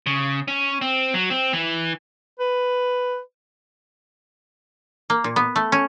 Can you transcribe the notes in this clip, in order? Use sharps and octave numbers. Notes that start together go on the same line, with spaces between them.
C#3
C#4
C4
F#3
C4
E3
B4
A#3
A#2
B3
A3
C#4